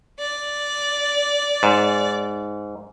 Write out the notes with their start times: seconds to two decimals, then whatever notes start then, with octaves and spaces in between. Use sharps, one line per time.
0.19 D5
1.63 G#2